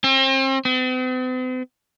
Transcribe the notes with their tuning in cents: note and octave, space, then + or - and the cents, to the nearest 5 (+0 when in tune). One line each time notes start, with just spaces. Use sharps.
C4 +35
C4 -45